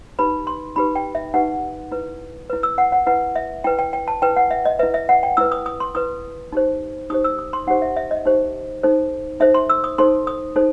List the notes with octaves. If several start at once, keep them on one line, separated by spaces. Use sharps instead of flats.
D#4 G4 B4 B5
C6
D#4 G4 B4 B5
G5
E5
D#4 G4 B4 F#5
E4 B4
E4 B4
E6
F#5
F#5
E4 B4 F#5
E5
E4 B4 G5
G5
G5
A5
E4 B4 G5
F#5
E5
D#5
E4 B4 E5
E5
F#5
G5
E4 B4 E6
D#6
D#6
C6
E4 B4 D#6
D#4 G4 C5
D#4 G4 C5 D#6
E6
D#6
C6
D#4 G4 C5 F#5
E5
E5
D#5
D#4 G4 C5
D#4 A4 C5
D#4 A4 C5 E5
C6
E6
D#6
D#4 A4 C5 C6
D#6
D#4 A4 C5